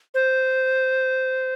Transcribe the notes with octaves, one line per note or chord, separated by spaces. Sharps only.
C5